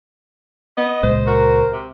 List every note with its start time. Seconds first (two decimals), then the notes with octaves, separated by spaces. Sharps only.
0.77 B3 D#5
1.03 C#2 A#2 G#3 C5
1.27 F#4 A#4
1.73 C3